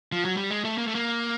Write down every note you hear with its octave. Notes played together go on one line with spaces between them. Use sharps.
F3
F#3
G3
G#3
A3
A#3
A3
A#3